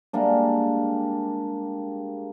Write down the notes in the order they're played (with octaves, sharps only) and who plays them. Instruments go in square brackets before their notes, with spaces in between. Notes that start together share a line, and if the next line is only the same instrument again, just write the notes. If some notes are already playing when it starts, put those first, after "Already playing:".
[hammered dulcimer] G3 G#3 A#3 D4